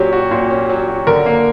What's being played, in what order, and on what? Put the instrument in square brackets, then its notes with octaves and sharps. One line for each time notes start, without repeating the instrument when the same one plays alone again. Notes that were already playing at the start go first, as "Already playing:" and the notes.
Already playing: [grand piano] A#2 F#3 C#4 [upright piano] G4
[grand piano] F#4
A#2
C#4
F#3
F#4
[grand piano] D3 [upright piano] A#4
[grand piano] A#3